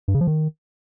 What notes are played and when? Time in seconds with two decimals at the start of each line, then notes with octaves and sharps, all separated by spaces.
0.08 G2
0.14 C#3
0.21 F3
0.27 D#3